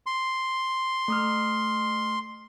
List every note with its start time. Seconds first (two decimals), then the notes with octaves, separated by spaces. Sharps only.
0.06 C6
1.08 A3 D#6 F6